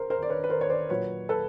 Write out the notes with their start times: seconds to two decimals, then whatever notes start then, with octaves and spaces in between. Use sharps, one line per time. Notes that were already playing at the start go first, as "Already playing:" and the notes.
Already playing: A#4 C5
0.10 A#4 C5
0.22 D5
0.30 B4 C#5
0.44 B4
0.50 A#4 C5
0.61 C#5
0.70 C5 D5
0.89 A#2 F#3 A#3 B4 C#5
1.29 A4 B4